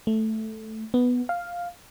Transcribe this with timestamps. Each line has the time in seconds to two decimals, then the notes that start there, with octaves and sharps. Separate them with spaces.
0.07 A3
0.94 B3
1.29 F5